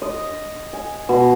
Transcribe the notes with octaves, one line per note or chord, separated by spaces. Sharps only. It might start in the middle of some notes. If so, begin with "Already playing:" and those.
D#5
G#5
B2